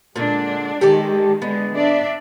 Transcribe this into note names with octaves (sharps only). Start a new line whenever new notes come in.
A#2 D3 G#3 D4
D#3 G#3 G4 A4 D5
D3 G#3 B3
D4 D5 E5